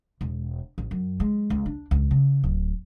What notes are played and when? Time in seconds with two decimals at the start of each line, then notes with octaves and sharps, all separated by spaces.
0.21 E1
0.78 A1
0.91 F#2
1.20 G#3
1.50 C#2
1.66 D4
1.91 C#2
2.11 C#3
2.43 D1